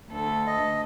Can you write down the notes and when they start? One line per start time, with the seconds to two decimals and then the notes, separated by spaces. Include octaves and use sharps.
0.11 D2 A4
0.47 D#5